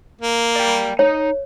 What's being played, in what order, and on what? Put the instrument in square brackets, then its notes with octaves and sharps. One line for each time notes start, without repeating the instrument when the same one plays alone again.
[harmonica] A#3
[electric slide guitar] D5 G5
[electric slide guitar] D#4 [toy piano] C#5